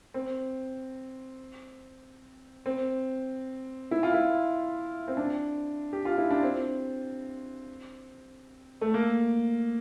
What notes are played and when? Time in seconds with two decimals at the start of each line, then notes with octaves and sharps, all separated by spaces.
0.14 C4
2.66 C4
3.91 E4
4.03 F4
4.14 E4
5.08 C4
5.17 D4
5.93 G4
6.05 F4
6.18 E4
6.30 D4
6.43 C4
8.81 A3
8.94 A#3